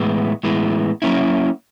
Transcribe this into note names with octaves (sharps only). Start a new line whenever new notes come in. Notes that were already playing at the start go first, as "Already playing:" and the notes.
Already playing: A2 E3 G#3 B3
A2 E3 G#3 B3
F#3 A#3 C#4 E4